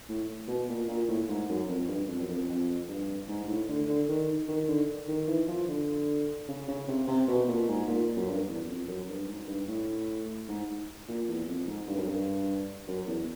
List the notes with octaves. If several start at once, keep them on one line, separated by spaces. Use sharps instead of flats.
A2
B2
A#2
A#2
A2
G#2
F#2
F2
G2
F2
F#2
F2
F2
G2
G#2
G#2
A2
D3
D3
D#3
D#3
D3
D#3
E3
F3
D3
C#3
C#3
C3
C3
B2
A#2
G#2
A#2
F#2
G2
E2
F2
F#2
G2
G#2
G2
A2
G#2
A#2
E2
F2
G#2
G2
F#2
G2
F#2
E2